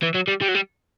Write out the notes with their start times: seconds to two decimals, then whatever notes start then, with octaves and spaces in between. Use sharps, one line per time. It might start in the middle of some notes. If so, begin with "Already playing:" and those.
0.03 E3
0.15 F#3
0.28 G3
0.42 G3
0.49 F#3
0.55 G3